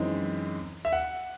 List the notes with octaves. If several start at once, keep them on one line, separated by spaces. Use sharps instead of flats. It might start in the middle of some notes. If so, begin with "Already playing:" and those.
Already playing: F#2 E3 G#3 C4 D#4
E5
F#5